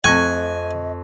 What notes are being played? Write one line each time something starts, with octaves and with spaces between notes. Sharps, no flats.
F2 A3 C4 D#5 G#5 C#6 F#6